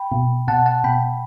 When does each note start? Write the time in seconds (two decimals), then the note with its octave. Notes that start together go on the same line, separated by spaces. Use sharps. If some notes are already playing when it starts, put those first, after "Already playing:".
Already playing: G5 B5
0.12 B2
0.48 B2 F#5 A5
0.66 F#5 A5
0.84 B2 G5 B5